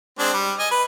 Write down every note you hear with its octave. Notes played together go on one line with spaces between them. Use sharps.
G#3 C4 D4
G3
D#5 G#5
B4